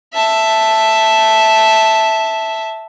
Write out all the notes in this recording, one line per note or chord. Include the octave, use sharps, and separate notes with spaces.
E5 A5